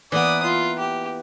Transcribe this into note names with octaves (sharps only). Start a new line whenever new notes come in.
E3 A#3 B3 D5 D#6
F4
G4